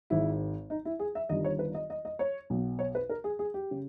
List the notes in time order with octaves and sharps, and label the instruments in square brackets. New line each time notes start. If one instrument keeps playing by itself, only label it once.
[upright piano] G#1 G#2 D#3 E4
D#4
E4
G#4
E5
G1 G2 D#3 D#5
C#5
B4
D#5
D#5
D#5
C#5
B1 B2
C#5
B4
A#4
G#4
G#4
G4
C#3